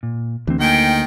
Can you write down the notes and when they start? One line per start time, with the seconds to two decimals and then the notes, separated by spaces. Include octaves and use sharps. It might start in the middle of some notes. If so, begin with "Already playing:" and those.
0.03 A#2
0.47 D2 E3 C4
0.60 D#3 A#3 G5 G#5